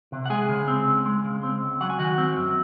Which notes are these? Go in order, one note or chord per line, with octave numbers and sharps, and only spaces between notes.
C3
F#5
G#3 G#4 G#5
C#3
C4
C#2
G#3
C#3
C4
C#2
F#3 F#5
G#5
D#3 F#4 F#5
C4
F#2